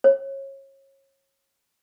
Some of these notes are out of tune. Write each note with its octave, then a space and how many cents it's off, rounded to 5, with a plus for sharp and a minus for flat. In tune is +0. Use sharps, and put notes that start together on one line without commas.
C#5 -30